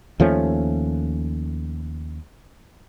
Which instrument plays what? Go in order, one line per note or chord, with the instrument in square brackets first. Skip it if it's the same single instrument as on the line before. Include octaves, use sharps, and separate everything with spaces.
[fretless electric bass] D#2 F3 A3 C#4